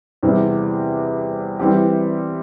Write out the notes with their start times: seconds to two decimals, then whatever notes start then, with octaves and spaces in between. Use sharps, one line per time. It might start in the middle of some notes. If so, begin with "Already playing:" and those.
0.23 E2 C3 G3 C4
1.59 E3 G3 C4 G4